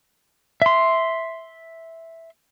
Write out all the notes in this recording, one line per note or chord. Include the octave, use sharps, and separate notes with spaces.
E5 C6